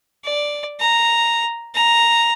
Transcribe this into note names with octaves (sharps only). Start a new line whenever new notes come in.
D5
A#5
A#5